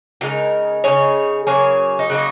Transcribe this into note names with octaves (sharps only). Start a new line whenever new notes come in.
C#3 G#3 D#4 F#4 A#4
C#3 G#3 D#4 G#4 C#5
C#3 F#3 A#3 G#4 C#5
D#4
C#3 F#3 A#3 D#4 F#4